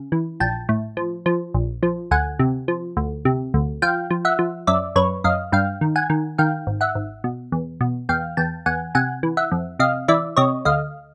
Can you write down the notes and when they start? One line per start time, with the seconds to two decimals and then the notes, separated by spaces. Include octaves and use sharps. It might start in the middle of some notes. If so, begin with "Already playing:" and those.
Already playing: C#3
0.12 E3
0.40 A#1 G5 A5
0.69 A2
0.97 F3
1.26 F3
1.54 A#1
1.83 F3
2.11 D2 F#5 G#5
2.39 C3
2.68 F3
2.97 D2
3.25 C3
3.54 D2
3.82 F3 F5 G5
4.11 F3
4.25 E5 F#5
4.39 F3
4.67 F#2 D5 E5
4.96 F#2 B4 C#5
5.24 F#2 D#5 F5
5.52 G2 F5 G5
5.81 D#3
5.96 F#5 G#5
6.10 D#3
6.38 D#3 F5 G5
6.67 G#1
6.81 E5 F#5
6.95 G#1
7.24 B2
7.52 E2
7.81 B2
8.09 E2 F5 G5
8.37 E2 G5 A5
8.66 E2 F#5 G#5
8.95 C3 F#5 G#5
9.23 E3
9.37 E5 F#5
9.52 F2
9.79 C3 D#5 F5
10.08 E3 D5 E5
10.37 C3 C#5 D#5
10.65 D2 D#5 F5